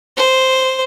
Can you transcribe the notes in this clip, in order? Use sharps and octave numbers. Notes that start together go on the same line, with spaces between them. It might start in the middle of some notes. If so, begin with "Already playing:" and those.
C5